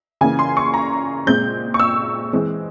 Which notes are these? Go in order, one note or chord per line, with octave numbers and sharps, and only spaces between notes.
C#3 E3 A#3 G#5
C6
C#6
A#5
A#2 G#3 C4 G6
C#6
E6
E3 G#3 C4